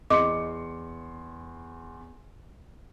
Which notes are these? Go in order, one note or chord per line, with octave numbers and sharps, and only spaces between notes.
E2 D#5 C6 D6 C#7